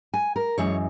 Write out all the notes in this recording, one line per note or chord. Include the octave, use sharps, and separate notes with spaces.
G#5
A#4
F#2 E3 G#3 C#5